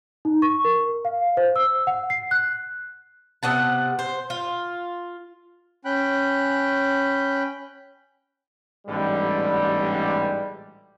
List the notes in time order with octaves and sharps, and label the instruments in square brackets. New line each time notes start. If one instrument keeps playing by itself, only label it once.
[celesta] D#4
C#6
A#4
F5
C5
E6
F#5
C7
F#6
[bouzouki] C3 B3 F#5 A5
C5
F4
[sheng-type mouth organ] C#4 G5 B5 F#6
[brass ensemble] A1 G#2 B2 D3 G3